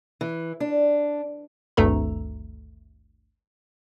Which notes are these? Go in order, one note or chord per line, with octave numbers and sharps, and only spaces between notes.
E3
D4
G#1 D2 G2 A3 A4 A#5